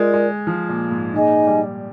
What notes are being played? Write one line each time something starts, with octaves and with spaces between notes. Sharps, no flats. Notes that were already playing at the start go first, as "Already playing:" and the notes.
Already playing: G#3 F4 A#4 D5
G#3
F3
A#2
G#2
A#2 D#4 G#4 D#5 G#5
G3